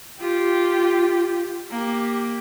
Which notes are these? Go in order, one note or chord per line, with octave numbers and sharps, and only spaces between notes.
F4 G4
A#3 G4